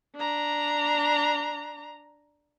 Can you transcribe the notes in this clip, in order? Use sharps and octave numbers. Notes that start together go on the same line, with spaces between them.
D4 A#5